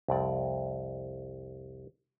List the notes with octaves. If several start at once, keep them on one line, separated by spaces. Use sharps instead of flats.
C2 F2 D5